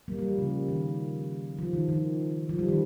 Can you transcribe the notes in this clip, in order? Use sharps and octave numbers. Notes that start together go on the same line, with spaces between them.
G3 A#3
G3
F3
C#3
D#3
F3
D#3
D#3
F3
G3
D#3